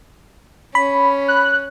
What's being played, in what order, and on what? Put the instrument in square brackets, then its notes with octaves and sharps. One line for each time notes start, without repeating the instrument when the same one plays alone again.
[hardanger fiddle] C#4 [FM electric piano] B5
[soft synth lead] F#6